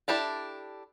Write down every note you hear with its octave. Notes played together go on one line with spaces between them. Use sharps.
D4 E4 G4 A4